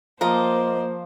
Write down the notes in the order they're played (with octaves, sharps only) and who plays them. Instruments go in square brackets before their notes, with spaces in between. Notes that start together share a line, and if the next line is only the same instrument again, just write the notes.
[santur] F3 [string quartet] A#3 C5 [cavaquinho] A#4 D5 D#5